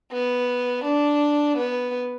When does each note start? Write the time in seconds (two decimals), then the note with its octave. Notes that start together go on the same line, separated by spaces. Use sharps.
0.12 B3
0.84 D4
1.57 B3